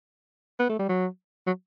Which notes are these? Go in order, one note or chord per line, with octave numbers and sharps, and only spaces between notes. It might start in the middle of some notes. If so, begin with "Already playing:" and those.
B3
A3
G3
F#3
F#3